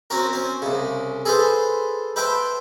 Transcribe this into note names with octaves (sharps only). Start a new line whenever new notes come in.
C4 C#4 F#4 A#4
C4 C#4
C2 C#3
G#4 A4 B4 C5
B4 C5 E5 G5 A5